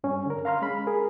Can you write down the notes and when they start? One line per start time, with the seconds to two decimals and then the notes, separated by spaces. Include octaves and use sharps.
0.04 G2 C#4
0.26 D3 A#4
0.45 F5 A#5 C6 F6
0.62 G#3 C#4 B5
0.87 G#4 A#4